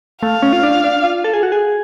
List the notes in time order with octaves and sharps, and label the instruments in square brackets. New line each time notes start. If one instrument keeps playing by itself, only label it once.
[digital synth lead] A3 [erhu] F5
[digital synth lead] C#4
F4
D4
D4
F4
A4
G#4
F#4
G#4